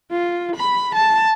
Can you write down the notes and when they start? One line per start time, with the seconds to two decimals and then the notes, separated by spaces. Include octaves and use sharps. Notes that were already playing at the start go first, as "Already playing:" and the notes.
0.11 F4
0.56 B5
0.95 A5